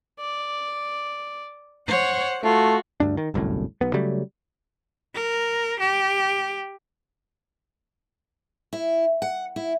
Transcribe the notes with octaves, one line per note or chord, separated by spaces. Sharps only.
D5
C5 C#5 F#5
A3 F4 F#4
D2 G2 D4
D#3
G1 C2 F#2 A2
B1 B3
C#3 F#3 G3 A3
A#4
G4
E4
F#5
E4